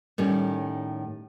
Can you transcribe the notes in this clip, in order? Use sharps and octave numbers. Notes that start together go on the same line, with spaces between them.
A2 D#3 G3 C#4